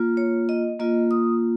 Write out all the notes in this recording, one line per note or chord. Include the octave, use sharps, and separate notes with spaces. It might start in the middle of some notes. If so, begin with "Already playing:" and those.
Already playing: A#3 F4
C#5
D#5
A#3 F4 D#5
D#6